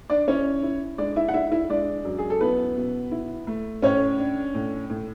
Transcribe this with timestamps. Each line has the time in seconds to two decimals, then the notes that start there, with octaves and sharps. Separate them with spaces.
0.10 D4 D5
0.27 C#4 E4 C#5
0.63 E4
0.98 G#3 D4 D5
1.16 E4 E5
1.28 F#5
1.34 D4 E4 E5
1.52 E4 E5
1.69 G#3 D4 D5
2.05 F#2
2.18 G#4
2.30 A4
2.41 B3 E4 B4
2.76 B2
3.11 E4
3.47 A3
3.82 A2 C#4 C#5
4.18 D4
4.54 A2
4.90 A2